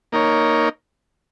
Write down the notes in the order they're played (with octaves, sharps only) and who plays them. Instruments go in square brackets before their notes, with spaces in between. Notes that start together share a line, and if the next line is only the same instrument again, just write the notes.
[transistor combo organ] A#3 D#4 A#4 C#5